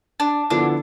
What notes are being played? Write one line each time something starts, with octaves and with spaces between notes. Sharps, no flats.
D4
D3 F3 B3 D4 E4 A4